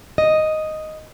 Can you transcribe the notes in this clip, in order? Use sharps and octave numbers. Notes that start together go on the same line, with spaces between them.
D#5